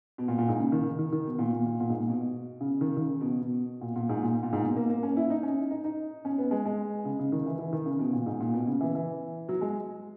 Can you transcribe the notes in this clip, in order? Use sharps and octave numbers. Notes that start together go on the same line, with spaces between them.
B2
A#2
A#2
G#2
C#3
D#3
D#3
D#3
B2
A#2
A#2
A#2
A#2
G#2
A#2
B2
C#3
D#3
D#3
C#3
B2
B2
A#2
A#2
G#2
A#2
A#2
G#2
B2
A#3
A#3
C#4
E4
D#4
C#4
D#4
D#4
C#4
B3
G#3
G#3
C#3
C#3
D#3
E3
E3
D#3
C#3
B2
A#2
G#2
A#2
B2
C#3
E3
E3
F#3
G#3